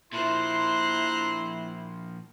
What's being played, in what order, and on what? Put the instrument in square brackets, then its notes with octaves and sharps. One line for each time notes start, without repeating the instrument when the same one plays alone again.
[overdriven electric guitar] A#2 F3 [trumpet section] E4 [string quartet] C5 A#5 F#6 [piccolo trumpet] C6